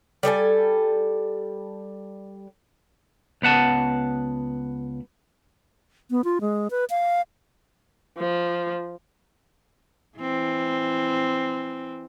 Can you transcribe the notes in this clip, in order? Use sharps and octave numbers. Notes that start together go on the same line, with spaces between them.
G3 A4 D5 G#5
C#2 B3 F#5 A5
B3
F4
G#3
B4
F5
F3
E3 C4